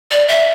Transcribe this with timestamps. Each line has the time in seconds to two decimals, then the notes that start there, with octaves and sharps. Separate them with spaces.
0.11 D5
0.28 E5